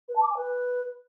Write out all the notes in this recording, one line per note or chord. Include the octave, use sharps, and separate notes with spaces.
B4
A5
D6
G#5
B4